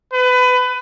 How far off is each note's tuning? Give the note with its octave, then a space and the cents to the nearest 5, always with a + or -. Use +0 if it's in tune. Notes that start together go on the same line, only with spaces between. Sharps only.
B4 +25